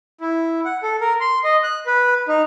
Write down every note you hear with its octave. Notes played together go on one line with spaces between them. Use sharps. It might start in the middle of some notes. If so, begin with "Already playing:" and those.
E4
F#5
A4
A#4
C6
D#5
F#6
B4
D#4